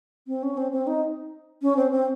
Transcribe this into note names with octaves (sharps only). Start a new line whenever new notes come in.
C4
C#4
C4
C4
D#4
C#4
C4
C4